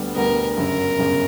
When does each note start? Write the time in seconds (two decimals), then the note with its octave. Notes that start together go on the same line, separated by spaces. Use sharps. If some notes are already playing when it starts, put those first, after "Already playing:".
Already playing: D2 D3 G3 B3
0.15 D2 D3 G3 B3 A#4
0.57 G1 F#2 C#3 A#4
0.99 G1 F#2 C#3